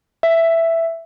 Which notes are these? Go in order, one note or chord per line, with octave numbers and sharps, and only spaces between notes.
E5